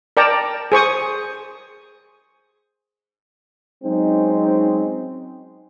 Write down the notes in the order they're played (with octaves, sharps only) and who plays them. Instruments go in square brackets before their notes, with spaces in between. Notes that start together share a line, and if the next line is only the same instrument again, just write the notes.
[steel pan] A#4 D5 G5 A5 A#5
G#4 C5 C#6 D#6
[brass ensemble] F#3 G#3 C4 C#4 D#4